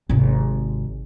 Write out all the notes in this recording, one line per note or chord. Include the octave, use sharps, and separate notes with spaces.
G#1 C3